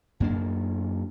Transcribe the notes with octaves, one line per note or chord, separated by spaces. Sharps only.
F#2 A#3 D4